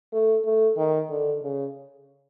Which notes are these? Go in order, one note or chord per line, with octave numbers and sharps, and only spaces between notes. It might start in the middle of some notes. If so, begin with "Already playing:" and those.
A3
A3
D#3
D3
C#3